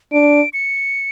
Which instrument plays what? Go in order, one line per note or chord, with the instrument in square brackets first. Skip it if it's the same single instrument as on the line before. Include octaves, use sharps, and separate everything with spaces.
[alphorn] D4 [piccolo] D7
[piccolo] C#7